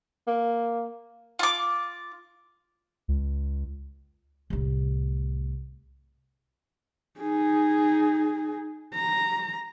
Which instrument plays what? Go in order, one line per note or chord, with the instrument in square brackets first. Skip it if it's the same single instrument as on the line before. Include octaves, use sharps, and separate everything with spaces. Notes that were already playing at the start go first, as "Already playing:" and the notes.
[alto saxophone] A#3
[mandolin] F4 D6
[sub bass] C#2
[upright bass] C2 A2
[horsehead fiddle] D#4 G#4
A#5